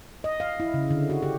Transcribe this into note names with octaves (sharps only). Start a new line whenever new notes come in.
D#5
F5
E4
C#3
D3
F#4
G4